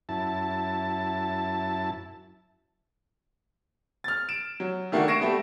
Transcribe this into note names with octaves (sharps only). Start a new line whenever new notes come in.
F#2 E4 A5
F6 A6
D7 E7
F#3
D#3 A3 A#3 D4 F#4
C#6 A#6 C7 D7 E7
G3 A3 B3